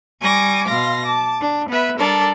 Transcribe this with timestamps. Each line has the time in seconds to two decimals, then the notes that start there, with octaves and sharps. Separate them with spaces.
0.20 G3 G#5 C#6 D6 A#6
0.67 B2 F5 C6 A#6
1.06 A5 D6
1.41 D4
1.70 B3 B4 E5
1.99 G3 D4 A4 A#4 D5